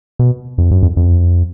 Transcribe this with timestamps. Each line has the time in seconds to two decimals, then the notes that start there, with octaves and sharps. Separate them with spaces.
0.19 B2
0.58 F2
0.71 F#2
0.83 F2
0.97 F2